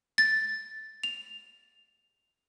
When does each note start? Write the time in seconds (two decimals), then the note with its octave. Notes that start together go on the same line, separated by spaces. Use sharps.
0.18 A6
1.03 F7